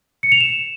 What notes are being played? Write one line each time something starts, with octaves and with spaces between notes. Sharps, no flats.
C#7
F7
E7